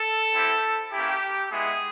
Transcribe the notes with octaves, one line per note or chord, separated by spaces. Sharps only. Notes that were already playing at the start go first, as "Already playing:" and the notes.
Already playing: A4
C4 E4 G4
A#3 C#4 E4 G4
G#3 B3 E4 G#4